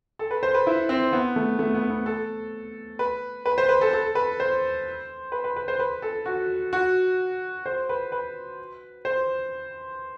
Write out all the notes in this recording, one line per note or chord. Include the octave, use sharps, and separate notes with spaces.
A4
B4
C5
B4
E4
C4
B3
A3
A3
B3
B3
A4
B4
B4
C5
B4
A4
A4
B4
C5
B4
B4
B4
C5
B4
A4
F#4
F#4
C5
B4
B4
C5